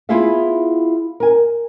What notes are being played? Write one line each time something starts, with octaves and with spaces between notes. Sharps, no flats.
B3 E4 F4 G#4 E5 F5
A#4 G#5